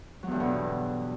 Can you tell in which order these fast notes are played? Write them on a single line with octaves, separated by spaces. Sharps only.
F#3 E2 G2 D3 B2